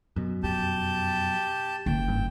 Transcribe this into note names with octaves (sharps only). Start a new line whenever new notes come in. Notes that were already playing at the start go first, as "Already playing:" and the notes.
F#2 B2
F2 G4 A5 G6
F#1 G5
G#1 G2